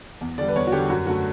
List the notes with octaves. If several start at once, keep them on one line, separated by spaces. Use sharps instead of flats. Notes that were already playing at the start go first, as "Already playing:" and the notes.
E2
D3 G3 D5
B4
E2 C#5
F#4
D3 G3 G4
F#2 F#4
D3 A3 F#4